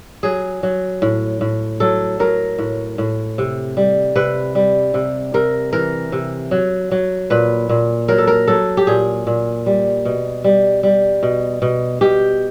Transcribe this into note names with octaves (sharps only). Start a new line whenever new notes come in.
F#3 G#4
F#3
A2
A2
F#3 A4
F#3 A#4
A2
A2
C3
G3
C3 B4
G3
C3
C3 A#4
E3 A#4
C3
F#3
F#3
A#2 B4
A#2
F#3 A#4
A4
A#4
F#3 A4
G4
A#2 G#4
A#2
G3
B2
G3
G3
B2
B2
B2 G4